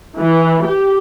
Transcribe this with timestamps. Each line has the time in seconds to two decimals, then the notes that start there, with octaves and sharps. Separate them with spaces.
0.18 E3
0.66 G4